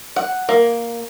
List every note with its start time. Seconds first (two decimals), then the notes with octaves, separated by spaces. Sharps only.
0.16 F#5
0.49 A#3